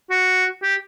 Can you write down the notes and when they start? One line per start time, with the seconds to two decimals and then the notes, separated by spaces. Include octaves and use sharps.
0.10 F#4
0.63 G4